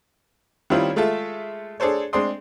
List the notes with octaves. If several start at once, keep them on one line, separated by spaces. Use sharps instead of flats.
D#3 G3 C4 C#4 E4 F4
G#3 A3 F4 A4 E5
D4 G#4 A4 C5 C#5
G#3 C4 D4 C6 D#6